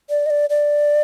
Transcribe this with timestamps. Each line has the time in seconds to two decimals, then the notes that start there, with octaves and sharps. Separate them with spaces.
0.10 D5
0.26 D#5
0.30 D5
0.50 D5